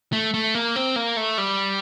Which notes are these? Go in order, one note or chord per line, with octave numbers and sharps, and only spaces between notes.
A3
A3
A#3
C4
A#3
A3
G3